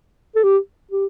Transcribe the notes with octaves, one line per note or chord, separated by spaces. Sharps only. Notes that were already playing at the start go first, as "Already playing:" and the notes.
A4
G4
G4